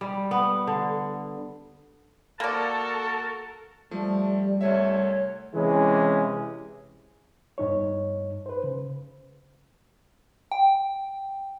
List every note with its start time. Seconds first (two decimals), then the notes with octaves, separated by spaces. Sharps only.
0.01 G3
0.31 B3
0.67 D3
2.40 A#3 F#4 A4 A#4 D5 A5
3.91 F3 G3 A3
4.61 C2 A3 C#5 E5
5.54 C3 E3 G#3 C#4
7.58 G2 D#4 C#5
8.46 B4 C5
8.64 C#3
10.52 G5